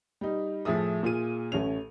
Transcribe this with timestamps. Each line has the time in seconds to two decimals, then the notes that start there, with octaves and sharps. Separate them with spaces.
0.21 G3 D#4
0.65 A2 F3 G#4 E5 D#6
1.03 A#2 F4 G#4 D#7
1.52 A1 A3 C#4 F7